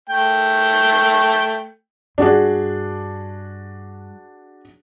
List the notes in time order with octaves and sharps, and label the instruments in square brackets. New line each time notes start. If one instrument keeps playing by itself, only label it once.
[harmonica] A3 G5
[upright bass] G2 [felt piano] D4 F#4 G#4